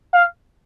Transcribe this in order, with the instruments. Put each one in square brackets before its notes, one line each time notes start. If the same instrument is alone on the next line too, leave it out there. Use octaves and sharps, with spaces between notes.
[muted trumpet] F5